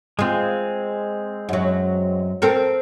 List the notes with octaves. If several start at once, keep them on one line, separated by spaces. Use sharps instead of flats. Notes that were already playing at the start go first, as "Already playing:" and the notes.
G#3 C4 F4 G#4
F#2 F#3
C4 A4 A#4